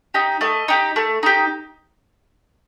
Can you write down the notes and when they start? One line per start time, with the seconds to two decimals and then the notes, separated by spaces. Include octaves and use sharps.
0.14 D#4 G4
0.41 A3 D#5
0.68 D#4 G4
0.96 A3
1.23 D#4 G4